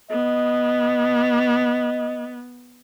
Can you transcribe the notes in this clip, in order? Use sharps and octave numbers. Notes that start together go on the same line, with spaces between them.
B3 D#5